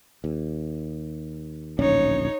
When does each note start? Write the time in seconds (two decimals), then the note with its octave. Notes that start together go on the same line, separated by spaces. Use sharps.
0.24 D#2
1.79 D1 A#1 C#4 D#4 C#5